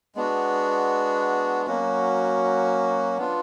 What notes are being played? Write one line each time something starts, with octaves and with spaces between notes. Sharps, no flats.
G#3 B3 D4 F#4
F#3 A#3 C#4 F#4
B3 D4 F4